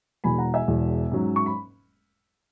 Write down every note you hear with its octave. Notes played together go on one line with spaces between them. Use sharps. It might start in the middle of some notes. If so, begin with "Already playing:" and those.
E1 E2 B2 G#5 B5
F#5 A#5
E5 G#5
E1 E2 B2
G#2 F#3 C#4
C#6
B5